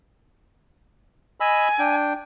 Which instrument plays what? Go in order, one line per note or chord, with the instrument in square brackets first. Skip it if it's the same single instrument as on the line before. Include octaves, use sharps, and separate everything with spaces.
[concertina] D#5 B5 E6 [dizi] G#5
[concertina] D4 G5